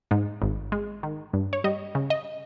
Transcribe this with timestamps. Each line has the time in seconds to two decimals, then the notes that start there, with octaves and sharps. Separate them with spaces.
0.11 G#2
0.42 G#1
0.72 G#3
1.03 D#3
1.33 G2
1.53 C#5
1.64 G3 D#5
1.95 C#3
2.10 D#5